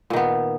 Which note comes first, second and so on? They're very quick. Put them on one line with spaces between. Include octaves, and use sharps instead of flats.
A#2 D#3 B3